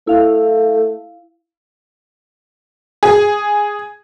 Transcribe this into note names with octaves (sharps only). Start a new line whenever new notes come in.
A3 E4 F5
G#4